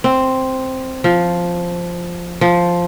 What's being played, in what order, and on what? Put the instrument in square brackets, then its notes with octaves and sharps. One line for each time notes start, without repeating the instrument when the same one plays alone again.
[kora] C4
F3
F3